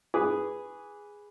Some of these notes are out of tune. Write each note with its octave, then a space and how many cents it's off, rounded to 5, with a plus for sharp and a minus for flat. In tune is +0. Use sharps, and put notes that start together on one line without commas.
G#4 -5 B4 +0 D6 -20